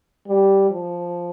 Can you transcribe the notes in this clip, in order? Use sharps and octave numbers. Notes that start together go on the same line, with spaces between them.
G3
F3